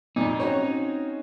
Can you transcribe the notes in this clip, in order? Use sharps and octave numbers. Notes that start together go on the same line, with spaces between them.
G#1 F2 A#2 D#4
C4 C#4 F#4 C#5